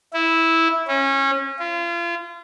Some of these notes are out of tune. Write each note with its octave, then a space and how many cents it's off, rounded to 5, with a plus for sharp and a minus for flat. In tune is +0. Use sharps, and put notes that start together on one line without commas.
E4 -10
C#4 -25
F4 -35